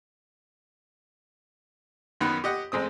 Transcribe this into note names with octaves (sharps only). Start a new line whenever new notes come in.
F#2 D#3 B3 D#4 B5 F#6
G4 D#5 F#5
A1 G#3 C4 D#6